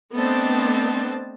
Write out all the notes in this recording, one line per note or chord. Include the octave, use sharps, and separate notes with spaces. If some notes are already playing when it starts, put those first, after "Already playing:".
A3 B3 C4 D4 D#5 A5